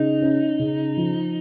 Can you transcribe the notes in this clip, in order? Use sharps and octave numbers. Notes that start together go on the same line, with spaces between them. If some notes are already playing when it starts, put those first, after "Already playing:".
Already playing: C#3 D#4
C#4
C#3
F3